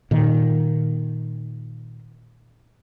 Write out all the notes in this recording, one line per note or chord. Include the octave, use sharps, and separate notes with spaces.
A#2 D#3